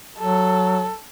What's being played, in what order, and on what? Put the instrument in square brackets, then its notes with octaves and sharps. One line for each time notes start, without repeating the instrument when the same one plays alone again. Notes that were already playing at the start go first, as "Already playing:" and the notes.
[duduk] F#3 [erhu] A4